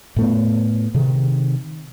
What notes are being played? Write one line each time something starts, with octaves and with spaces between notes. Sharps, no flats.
A2 A3 B3
C3 D#3